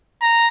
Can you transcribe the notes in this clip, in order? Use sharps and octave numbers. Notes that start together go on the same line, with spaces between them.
A#5